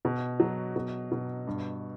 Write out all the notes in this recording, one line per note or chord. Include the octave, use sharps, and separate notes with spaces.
B2
F#3
B2
B2
G2